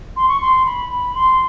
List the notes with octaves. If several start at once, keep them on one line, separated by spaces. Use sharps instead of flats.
C6
C#6
C6
B5
B5
C6